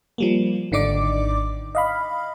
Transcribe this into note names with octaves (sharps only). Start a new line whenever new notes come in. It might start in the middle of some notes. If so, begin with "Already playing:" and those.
F3 G3 A#3
G#1 D3 D#4 D5 D6
D#5 F5 B5